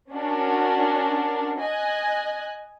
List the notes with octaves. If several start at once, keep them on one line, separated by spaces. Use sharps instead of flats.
C#4 D4 F#4 A#4
D#5 G#5 F#6